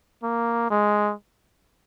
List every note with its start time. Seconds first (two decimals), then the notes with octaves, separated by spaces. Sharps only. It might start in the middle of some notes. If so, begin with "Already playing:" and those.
0.23 A#3
0.70 G#3